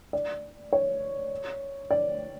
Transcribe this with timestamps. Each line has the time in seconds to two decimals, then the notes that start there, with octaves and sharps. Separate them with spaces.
0.13 D5
0.73 C#5
1.91 D5